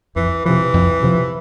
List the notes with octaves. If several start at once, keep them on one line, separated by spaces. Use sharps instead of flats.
F2 E3
C3 E3 F3
F2
C3 F3